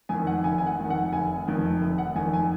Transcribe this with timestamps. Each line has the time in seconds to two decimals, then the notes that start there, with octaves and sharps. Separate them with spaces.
0.09 F2 D#3 G#5
0.27 F#5
0.44 F1 G#5
0.58 G#5
0.67 F#5
0.78 F2 D#3
0.90 F#5
1.13 F1 G#5
1.47 F2 D#3
1.81 F1
1.98 F#5
2.15 F2 D#3 G#5
2.33 G#5